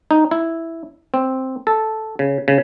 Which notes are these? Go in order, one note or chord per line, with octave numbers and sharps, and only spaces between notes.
D#4
E4
C4
A4
C#3
C#3